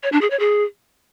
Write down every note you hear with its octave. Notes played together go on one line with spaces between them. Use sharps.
C#5
D4
G#4
C#5
G#4